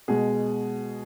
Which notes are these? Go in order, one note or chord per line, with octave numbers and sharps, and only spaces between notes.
B2 G#3 G#4